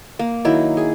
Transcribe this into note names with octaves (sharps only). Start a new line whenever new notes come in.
A#3
D#3 F#3 E4
G#4